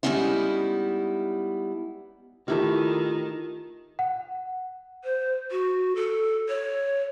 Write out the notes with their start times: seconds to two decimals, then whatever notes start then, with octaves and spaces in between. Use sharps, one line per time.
0.03 G3 G#3 B3 C#4 D#4 E4
2.48 D#3 A3 E4 F4 G4
3.99 F#5
5.04 C5
5.51 F#4
5.96 A4
6.49 C#5